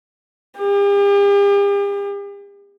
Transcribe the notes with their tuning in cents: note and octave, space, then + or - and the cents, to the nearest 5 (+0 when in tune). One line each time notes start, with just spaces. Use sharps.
G4 +45